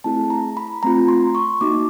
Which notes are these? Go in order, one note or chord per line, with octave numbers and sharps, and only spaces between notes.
A3 C4 E4 G#4 A5
A#5
B5
A3 C4 F4 A#5
C6
C#6
A#3 D#4 F#4 D6